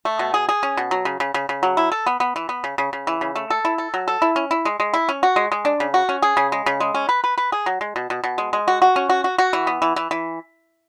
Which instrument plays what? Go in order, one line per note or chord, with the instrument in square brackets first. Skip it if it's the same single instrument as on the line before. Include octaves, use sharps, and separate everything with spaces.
[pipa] A3
B2
G#4
G#4
C#4
B2
F#3
C#3
C#3
C#3
C#3
F#3
E4
A4
B3
B3
E3
B3
C#3
C#3
C#3
E3
C#3
A3
A4
E4
A4
F#3
A4
E4
C#4
E4
G#3
G#3
E4
C#4
F#4
G#3
G#3
D4
C#3
F#4
C#4
G#4
C#3
G#3
C#3
G#3
C#4
B4
B4
B4
G#4
F#3
G#3
B2
B2
B2
G#3
G#3
F#4
F#4
C#4
F#4
F#4
F#4
E3
B3
E3
E3
E3